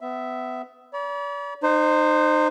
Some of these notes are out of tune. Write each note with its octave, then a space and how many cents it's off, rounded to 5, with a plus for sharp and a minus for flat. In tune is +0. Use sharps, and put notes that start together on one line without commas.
B3 +30 E5 +5
D5 -45 B5 -40
D#4 -30 C5 +0